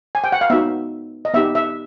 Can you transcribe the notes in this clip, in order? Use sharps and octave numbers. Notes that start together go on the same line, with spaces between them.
G#5
G5
F#5
F5
B3 D#4 F#4 E5
D#5
B3 D#4 G4 E5
E5